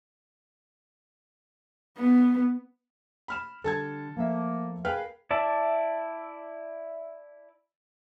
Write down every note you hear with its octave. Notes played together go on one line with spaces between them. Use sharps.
B3
B5 F6 E7
D3 G3 A4 A5 G#6
F3 A3 A#3 E5
G#4 A#4 B4 F5 G5 F6
E4 D5 E5 A5